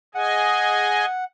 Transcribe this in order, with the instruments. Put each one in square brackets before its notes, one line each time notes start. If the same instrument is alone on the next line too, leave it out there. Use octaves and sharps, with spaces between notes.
[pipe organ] G#4 D#5 G#5 [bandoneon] F#5